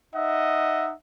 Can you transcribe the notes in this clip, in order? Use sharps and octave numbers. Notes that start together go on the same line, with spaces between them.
D#4 D#5 E5 F#5